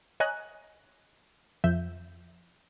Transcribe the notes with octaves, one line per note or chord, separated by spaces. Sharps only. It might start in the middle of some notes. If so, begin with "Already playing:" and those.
C#5 D#5 G#5 A#5 F#6
F2 F3 E5 G6